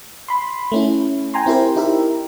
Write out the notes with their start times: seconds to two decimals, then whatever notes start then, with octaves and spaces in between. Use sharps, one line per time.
0.28 B5 C6
0.72 A3 C#4 E4
1.34 G5 G#5 A#5 C6
1.46 C4 E4 G4 A#4 C5
1.76 D#4 E4 G4 A#4 E5